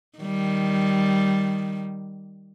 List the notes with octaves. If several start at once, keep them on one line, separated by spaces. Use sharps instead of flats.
D#3 G3